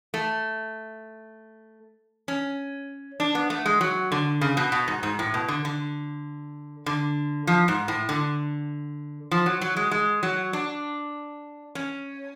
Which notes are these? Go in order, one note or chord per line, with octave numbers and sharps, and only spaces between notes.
A3
C#4
D4
B3
A3
G#3
F#3
D3
C#3
B2
B2
G#2
G#2
A2
B2
D3
D3
D3
F3
G#2
A2
D3
F3
F#3
F#3
G#3
G#3
F#3
D4
C#4